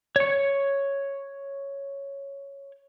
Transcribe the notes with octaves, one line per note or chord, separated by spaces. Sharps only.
C#5 C#6